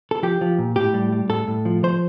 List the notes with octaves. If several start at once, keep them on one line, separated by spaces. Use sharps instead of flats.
A4
F3 G4
F3
A#2
A2 G4
G3
G3
A2 A4
A2
F3
F3 C5